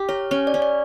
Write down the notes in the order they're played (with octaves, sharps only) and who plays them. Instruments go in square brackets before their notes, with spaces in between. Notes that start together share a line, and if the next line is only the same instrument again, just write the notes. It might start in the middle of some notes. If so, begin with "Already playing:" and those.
Already playing: [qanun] G4
[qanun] A#4 [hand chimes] C#5
[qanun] C#4 [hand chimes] C#5
[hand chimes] D5
[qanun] C#4
[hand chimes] D5